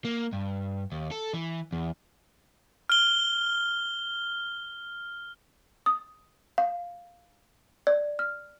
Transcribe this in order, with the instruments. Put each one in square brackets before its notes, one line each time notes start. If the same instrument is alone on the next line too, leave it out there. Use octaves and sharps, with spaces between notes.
[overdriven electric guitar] A#3
G2
D#2
A4
E3
E2
[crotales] F6 G7
[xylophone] D#6
F5
D5
F6